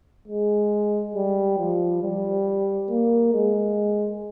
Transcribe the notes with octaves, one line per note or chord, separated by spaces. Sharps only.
G#3
G3
F3
G3
A#3
G#3